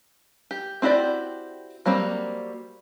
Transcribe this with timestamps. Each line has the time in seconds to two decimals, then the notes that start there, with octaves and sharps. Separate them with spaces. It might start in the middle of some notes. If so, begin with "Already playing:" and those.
0.51 G4
0.82 C4 E4 F#4 G4 D5
1.86 F#3 G3 A#3 C4